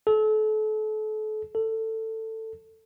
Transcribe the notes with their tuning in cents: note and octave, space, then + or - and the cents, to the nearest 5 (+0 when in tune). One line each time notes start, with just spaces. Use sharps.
A4 -35
A4 +15